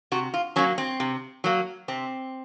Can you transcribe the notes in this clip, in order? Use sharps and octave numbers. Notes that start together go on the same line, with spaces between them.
C3 F#4
F4
F#3 A#3 C#4
C4
C3
F#3 A#3
C3 C4